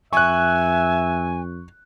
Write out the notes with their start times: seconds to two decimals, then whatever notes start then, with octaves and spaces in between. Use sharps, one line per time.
0.13 F2 E5 G#5 C#6 F#6